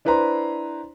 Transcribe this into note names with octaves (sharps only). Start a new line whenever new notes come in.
D4 E4 B4 C5 A#5 C6